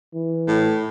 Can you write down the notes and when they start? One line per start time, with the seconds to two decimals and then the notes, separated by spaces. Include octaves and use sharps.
0.15 E3
0.48 A2